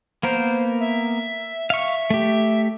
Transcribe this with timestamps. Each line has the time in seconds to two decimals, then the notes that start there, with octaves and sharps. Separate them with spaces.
0.23 A#3 B3 A#4 C5
0.80 E5
1.70 E5 F5 C#6
2.10 A3 G4